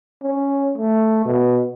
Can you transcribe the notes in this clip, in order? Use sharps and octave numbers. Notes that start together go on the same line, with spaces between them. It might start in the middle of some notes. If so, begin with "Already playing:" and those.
C#4
A3
B2